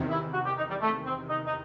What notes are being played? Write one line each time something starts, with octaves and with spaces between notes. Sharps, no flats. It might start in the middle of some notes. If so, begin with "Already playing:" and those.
Already playing: E2 C3 D#3
E4
F#4
G4
D#4
G3
A3
C4
D#4
D#4